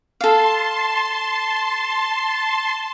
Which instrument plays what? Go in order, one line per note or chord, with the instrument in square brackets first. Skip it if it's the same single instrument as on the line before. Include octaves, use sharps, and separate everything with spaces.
[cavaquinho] A4 F5 [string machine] A5 C6